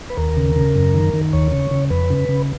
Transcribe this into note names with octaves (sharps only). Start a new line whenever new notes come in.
B4
D#2 A#4
C#3
C#3
F#2
D#3
D#3
D#2 C#5
C#3
C#3
F2 B4
C#3
C#3